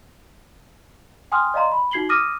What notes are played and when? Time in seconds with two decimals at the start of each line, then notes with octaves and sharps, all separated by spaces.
1.32 G5 G#5 C6 D#6 F6
1.54 D5 D#5 F5 A#5 C6
1.72 B5
1.91 D#4 F#4 G#6 C7 F#7 G7
2.09 D6 D#6 F6 A#6 D#7